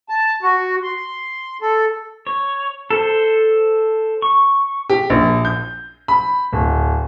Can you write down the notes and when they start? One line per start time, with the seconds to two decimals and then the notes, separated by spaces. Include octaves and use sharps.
0.09 A5
0.42 F#4
0.83 C6
1.62 A4
2.27 C#5
2.90 A4 C5
4.22 C#6
4.90 G4
5.10 A#1
5.45 G6
6.08 B5
6.52 D1